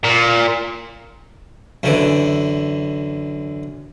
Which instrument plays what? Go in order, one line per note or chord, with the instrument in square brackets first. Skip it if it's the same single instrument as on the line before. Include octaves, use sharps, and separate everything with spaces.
[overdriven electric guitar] A#2
[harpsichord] F#2 D3 E3